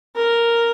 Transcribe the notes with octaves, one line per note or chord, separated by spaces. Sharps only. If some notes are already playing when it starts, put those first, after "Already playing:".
A#4